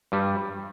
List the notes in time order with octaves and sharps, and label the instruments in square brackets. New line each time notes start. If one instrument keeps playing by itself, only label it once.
[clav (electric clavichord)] G2 G3